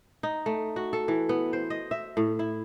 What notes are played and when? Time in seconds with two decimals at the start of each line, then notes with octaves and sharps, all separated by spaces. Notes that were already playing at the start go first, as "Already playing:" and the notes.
0.23 D#4
0.46 A3
0.76 F#4
0.93 A4
1.08 E3
1.29 B3
1.53 C5
1.70 D#5
1.91 E5
2.17 A2
2.39 E4